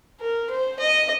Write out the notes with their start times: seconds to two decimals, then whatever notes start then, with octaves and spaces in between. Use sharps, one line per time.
0.20 A#4
0.50 C5
0.79 D#5